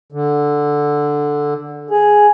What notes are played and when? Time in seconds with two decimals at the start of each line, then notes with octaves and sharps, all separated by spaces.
0.12 D3
1.90 G#4